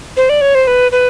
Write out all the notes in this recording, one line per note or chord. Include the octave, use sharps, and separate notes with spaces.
C5
D5
C#5
C5
B4
B4